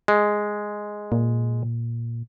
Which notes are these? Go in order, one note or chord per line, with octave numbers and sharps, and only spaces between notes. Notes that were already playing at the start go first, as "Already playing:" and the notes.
G#3
A#2